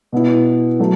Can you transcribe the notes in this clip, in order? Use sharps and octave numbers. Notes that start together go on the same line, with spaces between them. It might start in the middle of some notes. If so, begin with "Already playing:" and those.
B2 B3 E4
F#3 A3